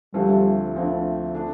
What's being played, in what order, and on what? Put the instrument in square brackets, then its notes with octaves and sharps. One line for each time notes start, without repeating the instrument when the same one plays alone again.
[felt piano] D2 D3 F3 A3 C4 [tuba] G3
[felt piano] D2 D3 F3 A3 C4
D3 A3 D4